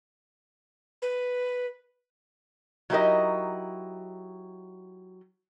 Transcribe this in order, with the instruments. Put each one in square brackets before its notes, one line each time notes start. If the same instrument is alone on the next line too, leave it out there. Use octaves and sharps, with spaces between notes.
[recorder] B4
[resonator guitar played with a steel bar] F#3 D#4 E4 G4 A#4 D#5